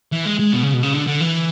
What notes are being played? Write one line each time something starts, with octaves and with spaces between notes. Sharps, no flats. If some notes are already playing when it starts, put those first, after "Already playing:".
E3
G#3
G#3
B2
C#3
B2
C#3
D3
D3
E3